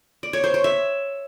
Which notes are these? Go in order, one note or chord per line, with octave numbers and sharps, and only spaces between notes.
D5
C#5
C5
C#5
E5